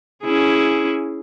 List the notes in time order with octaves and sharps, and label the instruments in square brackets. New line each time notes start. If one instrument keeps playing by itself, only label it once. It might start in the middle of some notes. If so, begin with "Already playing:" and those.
[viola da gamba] C#4 E4 G#4